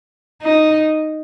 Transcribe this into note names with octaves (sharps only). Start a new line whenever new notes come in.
D#4